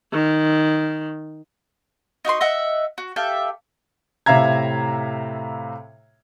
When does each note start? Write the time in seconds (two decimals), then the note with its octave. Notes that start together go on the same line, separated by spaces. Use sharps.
0.13 D#3
2.25 D#4 F#4 B4 C6
2.41 D#5 E5 F#5
2.98 F#4
3.16 G4 A4 E5 F5
4.26 A2 C3 E5 F5 A#5 G#6